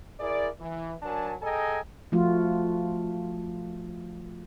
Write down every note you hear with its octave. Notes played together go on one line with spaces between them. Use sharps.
E4 G#4 A#4 D5
E3
F#3 D4 A#4 G#5 A5
G#4 A4 D#5 G5 G#5 A#5
F3 A3 F4 F#4